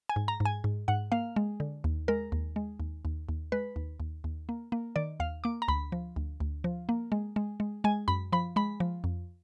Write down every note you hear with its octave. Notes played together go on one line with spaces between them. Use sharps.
G#5
G#2
A#5
G#2
G#5
G#2
G#2 F#5
A#3 F5
G#3
D3
D#2
G#3 A#4
D#2
G#3
D#2
D#2
D#2
G#3 B4
D#2
D#2
D#2
A#3
A#3
D#3 D5
D#2 F5
A#3 D6
A#5
D2 B5
F3
D2
D2
F3
A#3
G#3
G#3
G#3
G#3 G#5
F#2 B5
F3 B5
G#3 B5
F3
F2